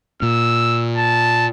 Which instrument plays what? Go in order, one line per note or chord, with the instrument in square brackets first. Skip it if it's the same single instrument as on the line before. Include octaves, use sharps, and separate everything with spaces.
[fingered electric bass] A#2 [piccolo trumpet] E6
[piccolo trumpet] A5